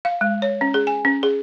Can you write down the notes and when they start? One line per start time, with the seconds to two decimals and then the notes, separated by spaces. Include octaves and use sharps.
0.05 F5
0.21 G#3
0.42 C#5
0.61 C#4
0.74 G#4
0.87 G#5
1.05 C#4
1.23 G#4